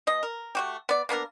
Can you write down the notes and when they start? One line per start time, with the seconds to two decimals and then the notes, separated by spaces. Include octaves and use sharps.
0.07 B2 D#5
0.23 A#4
0.55 A3 F#4 G4
0.89 B3 D5
1.09 A#3 B3 D4 A#4